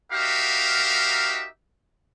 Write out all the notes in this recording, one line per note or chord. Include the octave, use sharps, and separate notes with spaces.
D#4 F#4 G4 A#4 E5 F5